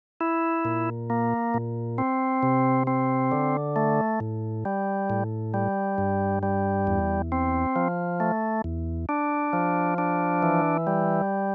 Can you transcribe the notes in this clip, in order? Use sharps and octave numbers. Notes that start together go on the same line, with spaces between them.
E4
A#2
A#3
A#2
C4
C3
C4
D3
A3
A2
G3
A2
G3
G2
G3
E2
C4
F3
A3
E2
D4
F3
D4
E3
G3